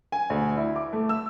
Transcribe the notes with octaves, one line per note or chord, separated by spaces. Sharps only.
G#5
D2
E4
D6
A3
E6